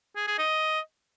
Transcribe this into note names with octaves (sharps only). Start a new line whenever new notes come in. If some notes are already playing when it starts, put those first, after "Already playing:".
G#4
G#4
D#5